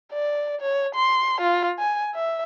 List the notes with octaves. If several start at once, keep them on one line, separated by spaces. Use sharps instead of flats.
D5
C#5
C6
F4
G#5
E5